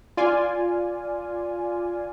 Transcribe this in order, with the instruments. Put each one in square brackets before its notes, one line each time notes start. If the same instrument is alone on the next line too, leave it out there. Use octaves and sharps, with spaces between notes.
[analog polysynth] F4 D5 G#5